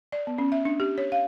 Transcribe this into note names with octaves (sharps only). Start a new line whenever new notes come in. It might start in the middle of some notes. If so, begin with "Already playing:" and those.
D5
B3
C#4
E5
D4
G4
C#5
F5